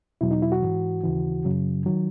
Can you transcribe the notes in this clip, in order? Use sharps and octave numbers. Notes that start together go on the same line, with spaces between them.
E2 B2 F#3 E4
D#4
E4
F#4
G#2 E3
D#2 C#3 E3
F#2 C#3 F#3
D#3 F#3